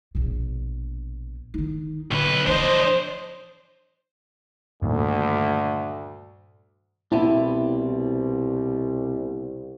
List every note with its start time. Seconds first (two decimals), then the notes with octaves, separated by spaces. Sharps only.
0.15 A#1 B2
1.54 D#3 D#4
2.11 B1 D3 B4
2.47 E3 F3 D4 C5 D#5
4.82 D2 G2 A#2 D#3
7.12 C2 B2 C4 D4 E4